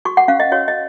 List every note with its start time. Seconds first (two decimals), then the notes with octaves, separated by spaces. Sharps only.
0.05 F#4 C#6
0.17 F#5
0.28 C#4 F5
0.40 D#5
0.52 F#4 C#5
0.68 D#5